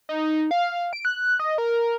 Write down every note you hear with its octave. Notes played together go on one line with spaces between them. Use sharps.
D#4
F5
D7
F#6
D#5
A#4